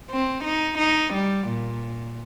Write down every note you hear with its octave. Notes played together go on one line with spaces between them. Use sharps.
C4
D#4
D#4
G3
A#2